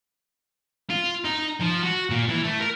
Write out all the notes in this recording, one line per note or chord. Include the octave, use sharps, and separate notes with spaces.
F4
D#4
F3
F#4
A#2
E3
A3
A#4